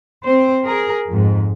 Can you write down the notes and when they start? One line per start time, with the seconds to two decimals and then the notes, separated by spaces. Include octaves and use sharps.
0.24 C4 C5
0.65 G#4 A#4
1.08 F2 G#2